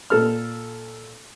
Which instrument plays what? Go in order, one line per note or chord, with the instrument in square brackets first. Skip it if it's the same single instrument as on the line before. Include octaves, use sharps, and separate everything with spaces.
[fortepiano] A#2 A4 F6